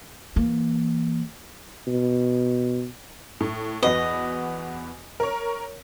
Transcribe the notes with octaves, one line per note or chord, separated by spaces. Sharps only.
E3 A#3
B2
A2
E2 F#4 B4 D#5
A#4 C#5